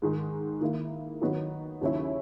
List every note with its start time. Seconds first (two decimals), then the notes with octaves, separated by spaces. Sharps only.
0.02 G#2 D#3 G#3
0.61 D#3 A#3 E4
1.21 D#3 F#3 B3 D#4 F#4
1.81 D#2 C#3 F#3 C#4 E4